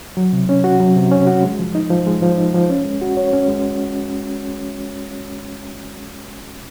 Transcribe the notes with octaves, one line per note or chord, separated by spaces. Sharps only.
F#3
C3
C#4
F#4
F#3
C3
C#4
F#4
G#3
F3
D#4
F3
G#3
F3
D#4
F3
C#4
G#3
F#4
C#5
C#4
G#3